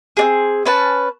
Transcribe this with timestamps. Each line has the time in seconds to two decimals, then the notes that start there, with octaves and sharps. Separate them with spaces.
0.17 C4 D4 G#4
0.65 C#4 B4 A5